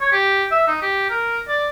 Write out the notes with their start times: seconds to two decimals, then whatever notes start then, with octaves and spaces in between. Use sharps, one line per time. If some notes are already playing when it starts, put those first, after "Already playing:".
0.01 C#5
0.12 G4
0.51 E5
0.68 D#4
0.82 G4
1.10 A#4
1.48 D5